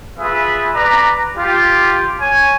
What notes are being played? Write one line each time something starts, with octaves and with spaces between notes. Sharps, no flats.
F4 G#4 B4 E5
B4 D5 A#5
F4 G4
C#5 G#5